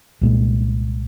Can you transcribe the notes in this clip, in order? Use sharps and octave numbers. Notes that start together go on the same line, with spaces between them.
C2 A#2 G#3